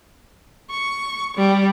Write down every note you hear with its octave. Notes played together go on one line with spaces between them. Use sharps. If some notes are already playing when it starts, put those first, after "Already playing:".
C#6
G3